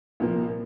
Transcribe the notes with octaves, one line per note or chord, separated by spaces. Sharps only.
C2 A#2 F3 A#3